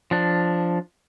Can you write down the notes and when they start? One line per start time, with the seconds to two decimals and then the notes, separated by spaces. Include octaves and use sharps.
0.11 F3 D4